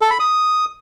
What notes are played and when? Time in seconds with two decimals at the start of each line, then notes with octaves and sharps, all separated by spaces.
0.01 A4
0.11 B5
0.20 D#6